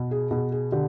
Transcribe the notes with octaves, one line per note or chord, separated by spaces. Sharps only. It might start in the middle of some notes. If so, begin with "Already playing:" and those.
Already playing: B2
G#4
B2 G#4
G#4
D3 G4